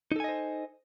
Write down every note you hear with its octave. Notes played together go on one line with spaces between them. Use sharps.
D#4 A4 C5 D#5 G#5